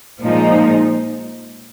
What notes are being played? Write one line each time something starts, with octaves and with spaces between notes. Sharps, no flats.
A#2 F3 G#3 D#4